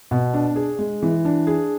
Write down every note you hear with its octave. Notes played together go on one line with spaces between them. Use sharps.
B2
D4
G#4
G#3
E3
D4
G#4